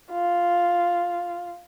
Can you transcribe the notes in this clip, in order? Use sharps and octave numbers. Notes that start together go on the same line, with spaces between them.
F4